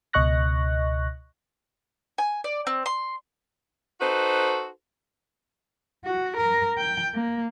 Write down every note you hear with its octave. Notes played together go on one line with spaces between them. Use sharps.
C#2 B2 D#5 C#6 F#6 A#6
G#5
D5
C4
C6
D#4 F#4 A4 B4 C5
F#4
A#4
G5
A#3